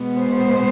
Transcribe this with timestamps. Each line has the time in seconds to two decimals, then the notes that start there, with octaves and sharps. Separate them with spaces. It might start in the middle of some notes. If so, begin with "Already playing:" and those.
Already playing: B2 G#3 B3
0.16 C5